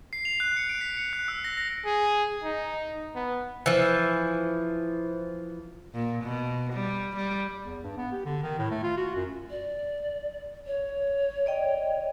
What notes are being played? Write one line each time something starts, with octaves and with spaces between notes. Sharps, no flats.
C7
F7
F#6
C#7
D7
B6
C#7
F#6
E6
A#6
A#6
G#4
D#4
B3
E3 F3
A#2
B2
G3
G3
E2
G2
B3
G4
D3
D#3
A2
A3
F4
F#4
F#2
D5
C#5
D5 D#5 G5